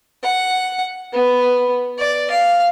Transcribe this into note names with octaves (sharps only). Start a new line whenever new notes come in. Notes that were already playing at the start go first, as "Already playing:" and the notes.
F#5
B3
D5
F5